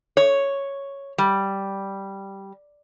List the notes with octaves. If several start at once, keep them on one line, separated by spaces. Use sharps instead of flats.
C#5
G3